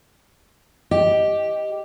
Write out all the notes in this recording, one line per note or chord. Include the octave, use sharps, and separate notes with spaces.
G4 D#5